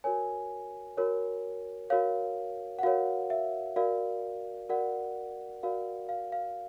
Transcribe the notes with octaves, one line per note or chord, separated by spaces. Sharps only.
F#4 A#4 C#5 G#5
F#4 A#4 C#5
F#4 A#4 C#5 F5
F#5
F#4 A#4 C#5 F5
E5
F#4 A#4 D5 F5
F#4 A#4 D5 F#5
F#4 A#4 D5 F5
F5
F5